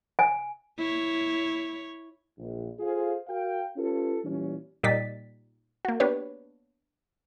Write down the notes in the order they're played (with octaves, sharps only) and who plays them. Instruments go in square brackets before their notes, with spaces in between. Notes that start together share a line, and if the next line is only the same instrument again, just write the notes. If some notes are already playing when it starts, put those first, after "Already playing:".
[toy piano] G#5
[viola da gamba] E4 C#5
[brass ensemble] A#1
F4 G#4 A4 C5 F5
F#4 A#4 F5 G5
C#4 F4 G4 A4 B4
A#2 E3 G3 C#4
[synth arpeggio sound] A#2 G3 D#4 D5 A6 B6
A#3 F#4
B3 D4 G4 B4 C#5